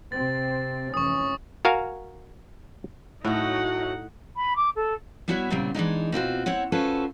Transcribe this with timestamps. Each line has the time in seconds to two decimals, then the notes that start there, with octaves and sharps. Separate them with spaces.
0.12 C3 C4 A6
0.94 F1 E3 C#4 C#6 D#6
1.65 F#4 A#4 F5 G#5
3.25 A2 F#3 A3 D#4 F#4 F#5
4.36 B5
4.56 D6
4.76 A4
5.28 G3 B3 E4 F#4 C#5 E5
5.50 A#2 C#3 G3 C4
5.75 E3 G#3 D4 D#4
6.12 B2 C4 F4 F#4
6.46 C4 E4 C#5 F#5
6.72 C#4 F4 F#4 A4 B4 C5